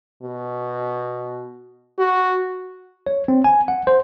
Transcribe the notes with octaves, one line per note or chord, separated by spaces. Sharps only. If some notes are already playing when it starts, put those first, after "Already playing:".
B2
F#4
C#5
C4
G#5
F#5
C5